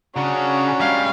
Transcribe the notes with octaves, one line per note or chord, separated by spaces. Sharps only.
C#3 C#4 D4 F#4 A#5
G3 G#3 F5